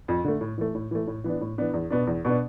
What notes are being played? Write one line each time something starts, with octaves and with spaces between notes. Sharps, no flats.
F2
D3 A3
A2
E3 A3
A2
E3 A3
A2
E3 B3 D4
A2
E3 B3 D4
E2
B2 B3 D4
E2
B2 B3 D4